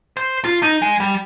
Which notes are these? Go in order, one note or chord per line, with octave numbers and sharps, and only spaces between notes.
C5
F4
D#4
G#3
G3